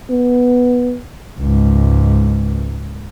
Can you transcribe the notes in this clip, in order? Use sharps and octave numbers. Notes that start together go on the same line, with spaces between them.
B3
C#2 G#2